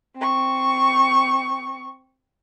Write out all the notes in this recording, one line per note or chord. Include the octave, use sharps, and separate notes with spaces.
C4 C#6